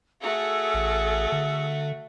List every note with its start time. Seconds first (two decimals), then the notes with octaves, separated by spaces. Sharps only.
0.21 A3 F#4 G#4 A4 E6
0.74 A1
1.32 D3